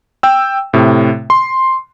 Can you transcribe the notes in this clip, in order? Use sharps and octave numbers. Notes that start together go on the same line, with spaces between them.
G5 E6
A2 C3
C6